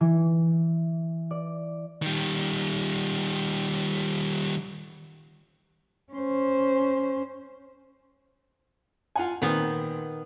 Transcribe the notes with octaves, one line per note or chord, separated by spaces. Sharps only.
E3
D5
D#3 G3
C#4 C5
F4 F#5 G#5
A#2 D#3 B3 C4